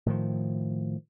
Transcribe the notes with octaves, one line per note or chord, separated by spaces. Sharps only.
A2 D#3 F3